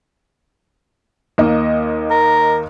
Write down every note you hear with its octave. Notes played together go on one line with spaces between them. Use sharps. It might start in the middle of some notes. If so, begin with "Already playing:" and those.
D#2 A#3 D#5
A#4